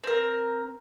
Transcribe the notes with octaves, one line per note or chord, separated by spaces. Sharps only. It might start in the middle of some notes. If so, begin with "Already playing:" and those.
C4 A#4